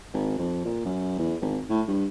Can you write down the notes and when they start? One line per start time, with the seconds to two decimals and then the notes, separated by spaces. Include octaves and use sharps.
0.13 G#1
0.39 F2
0.65 A#2
0.85 F#2
1.19 E2
1.42 G#1
1.70 A2
1.88 G2